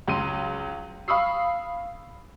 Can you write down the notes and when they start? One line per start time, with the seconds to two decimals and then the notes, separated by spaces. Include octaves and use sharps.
0.07 C#2 F#3 C6 D#7
1.08 F5 B5 C#6 D#6 E6 C7